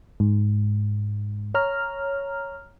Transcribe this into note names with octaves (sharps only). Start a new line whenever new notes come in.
G#2
C#5 A#5 F6